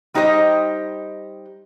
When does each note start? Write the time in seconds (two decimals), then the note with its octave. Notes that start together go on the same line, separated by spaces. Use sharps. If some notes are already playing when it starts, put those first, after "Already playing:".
0.14 G3 D#4 G4 C5 D#5